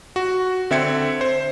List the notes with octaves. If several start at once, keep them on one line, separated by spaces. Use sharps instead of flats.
F#4
D3 C4 E5 G5 G#6 C#7
C5